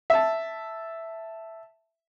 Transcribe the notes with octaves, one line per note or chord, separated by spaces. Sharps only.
E5 A5